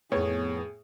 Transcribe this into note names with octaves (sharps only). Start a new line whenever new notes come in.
F2 A2 B3 G#4 C#5